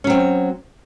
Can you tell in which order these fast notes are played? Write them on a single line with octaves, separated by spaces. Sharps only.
C#4 F#3 C4